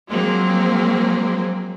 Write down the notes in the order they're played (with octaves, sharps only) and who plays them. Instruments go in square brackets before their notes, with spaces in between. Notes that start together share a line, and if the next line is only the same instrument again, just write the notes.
[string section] F3 F#3 G#3 A#3 C4